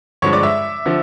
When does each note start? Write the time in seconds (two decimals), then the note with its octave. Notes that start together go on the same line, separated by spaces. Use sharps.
0.22 G2 D3 F3 G#3 C#5 C#6
0.33 D5 D6
0.43 E5 E6
0.86 D3 F3